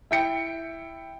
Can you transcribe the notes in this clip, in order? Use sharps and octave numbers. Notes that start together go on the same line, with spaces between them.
E4 G5 C#7